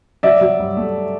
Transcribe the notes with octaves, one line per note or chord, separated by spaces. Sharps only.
F#3 D5 E5
F#3
G2
A3